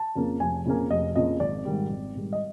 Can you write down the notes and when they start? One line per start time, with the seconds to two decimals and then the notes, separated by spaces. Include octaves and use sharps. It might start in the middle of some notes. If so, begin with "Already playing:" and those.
Already playing: A5
0.16 F2 C#3 F3 A#3
0.40 F1 G#5
0.66 F2 C#3 F3 A#3
0.90 F1 D#5
1.15 F2 C#3 F3 A#3 D#5
1.40 G#1 D5
1.65 G#2 D#3 G3
1.90 G#1
2.15 G#2 D#3 G3
2.33 D#5